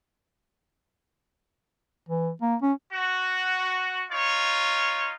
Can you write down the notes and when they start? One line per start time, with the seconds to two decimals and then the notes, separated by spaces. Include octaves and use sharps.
2.09 E3
2.42 A#3
2.62 C#4
2.93 F#4
4.11 D#4 F4 C#5